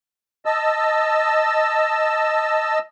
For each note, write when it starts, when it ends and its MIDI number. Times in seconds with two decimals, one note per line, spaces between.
0.45 2.79 75
0.45 2.79 81
0.45 2.79 88